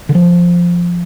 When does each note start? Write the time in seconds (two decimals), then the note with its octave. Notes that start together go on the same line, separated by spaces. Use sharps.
0.09 D3
0.15 F3